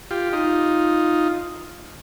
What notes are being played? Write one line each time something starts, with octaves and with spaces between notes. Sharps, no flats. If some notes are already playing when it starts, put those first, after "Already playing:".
F4 G4
D#4 F4